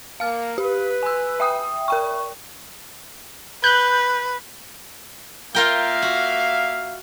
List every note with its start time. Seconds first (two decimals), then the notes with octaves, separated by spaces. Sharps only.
0.20 A#3 F5 F6
0.58 G4 B4
1.03 G#5 E6
1.40 E5 G5 D#6
1.88 A#4 G5 C#6
3.64 B4 F#6 G6
5.55 A#3 F4 A#4 E5 F5 G5
6.02 F#4